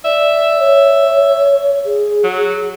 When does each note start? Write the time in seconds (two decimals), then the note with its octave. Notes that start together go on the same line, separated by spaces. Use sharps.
0.05 D5 E5
0.60 C#5
1.86 G#4
2.24 F#3